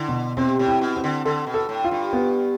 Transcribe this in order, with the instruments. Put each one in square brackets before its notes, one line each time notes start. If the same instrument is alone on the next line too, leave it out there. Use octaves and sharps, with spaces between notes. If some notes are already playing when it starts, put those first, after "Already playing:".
Already playing: [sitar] D3 [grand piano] E4
[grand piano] B2
[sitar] C3 [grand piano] C4
[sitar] A2
[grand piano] E4
[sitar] B2
[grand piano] C4
[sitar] D3
[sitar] D3 [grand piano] A4
[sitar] B2
[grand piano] A4
[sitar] A2
[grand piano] F4
[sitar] G2
[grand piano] B3